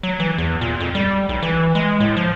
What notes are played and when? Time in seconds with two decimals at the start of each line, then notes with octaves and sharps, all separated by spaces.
0.03 F#3
0.20 E3
0.38 E2
0.61 A#2
0.80 F2
0.95 G3
1.29 B1
1.43 E3
1.75 G#3
2.00 A2
2.17 F3